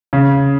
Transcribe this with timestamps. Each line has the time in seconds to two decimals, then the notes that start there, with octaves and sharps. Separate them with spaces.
0.13 C#3